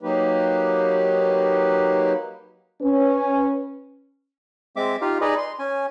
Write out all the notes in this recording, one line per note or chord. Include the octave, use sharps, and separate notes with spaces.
F#3 A#3 D#4 G4 B4
C#4 B4
G#3 C4 E5 D6
D#4 F4 G4 F5
D#4 G#4 B4 D5 D#5
C6
C#4 G#5